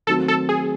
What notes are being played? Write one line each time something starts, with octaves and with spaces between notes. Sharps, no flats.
D#3 F#3 A3 C4 F#4 A4
A4
G#4